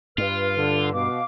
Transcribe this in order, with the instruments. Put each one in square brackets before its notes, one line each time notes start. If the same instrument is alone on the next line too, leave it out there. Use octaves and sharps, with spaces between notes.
[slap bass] G2 [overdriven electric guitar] F4 [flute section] B4 F6
[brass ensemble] D3
[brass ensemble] B2 [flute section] F5 D6